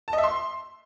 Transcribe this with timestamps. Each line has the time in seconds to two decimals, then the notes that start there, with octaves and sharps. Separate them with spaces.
0.08 A5
0.13 D#5
0.18 E5
0.24 C6